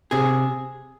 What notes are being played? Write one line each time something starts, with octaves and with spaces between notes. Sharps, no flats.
C3 G#4